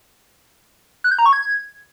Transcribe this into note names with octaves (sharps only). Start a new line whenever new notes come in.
F#6
G6
A#5
C#6
G#6